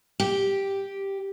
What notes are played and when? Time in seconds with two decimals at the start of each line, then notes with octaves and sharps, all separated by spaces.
0.20 G4